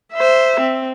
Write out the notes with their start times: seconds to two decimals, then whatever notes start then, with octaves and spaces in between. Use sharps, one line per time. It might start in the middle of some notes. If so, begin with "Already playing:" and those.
0.13 C5 E5
0.60 C4